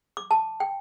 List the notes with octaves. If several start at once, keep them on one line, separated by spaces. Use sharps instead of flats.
D6
A5
G5